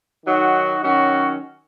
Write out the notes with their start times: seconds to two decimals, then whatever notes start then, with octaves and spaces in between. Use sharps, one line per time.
0.24 D#3 F#3 D#4 F#4
0.82 D#3 F#3 C#4 F#4